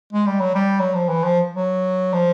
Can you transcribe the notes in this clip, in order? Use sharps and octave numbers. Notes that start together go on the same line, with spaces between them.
G#3
G3
F#3
G3
F#3
F3
E3
F3
F#3
F3